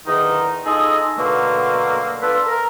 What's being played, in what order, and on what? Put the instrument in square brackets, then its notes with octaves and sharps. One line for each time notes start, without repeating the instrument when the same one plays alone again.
[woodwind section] E2 D3 D#3 D#4
D#4 F4 G#4 A4 D#5
B2 D3 F#3 A3 A#3
B3 D4 F4 A4 B4
A#4